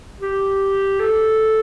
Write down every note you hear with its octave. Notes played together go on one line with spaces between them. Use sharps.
G4
A4